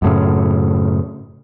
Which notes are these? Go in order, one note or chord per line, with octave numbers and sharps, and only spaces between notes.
F#2 A2 C#3